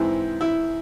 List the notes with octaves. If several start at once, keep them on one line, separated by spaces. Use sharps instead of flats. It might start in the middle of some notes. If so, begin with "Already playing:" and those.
Already playing: G#2 E3 G#3 C4 E4
E4